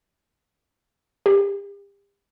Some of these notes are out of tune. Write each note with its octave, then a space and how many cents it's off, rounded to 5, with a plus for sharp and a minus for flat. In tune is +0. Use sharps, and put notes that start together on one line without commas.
G4 +35